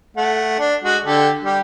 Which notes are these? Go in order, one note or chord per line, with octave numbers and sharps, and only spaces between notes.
A3 F#5
D4
G#3 F#4
D3 G4 A4
G3 G4